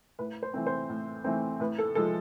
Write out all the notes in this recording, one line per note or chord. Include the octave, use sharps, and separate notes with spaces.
A2 B4
C5
E3 A3 C4
C5
A2
E3 A3 C4
A2 B4
A4
F3 G#3 A4